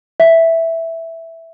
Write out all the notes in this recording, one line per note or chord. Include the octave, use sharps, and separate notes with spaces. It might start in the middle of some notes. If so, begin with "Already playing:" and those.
E5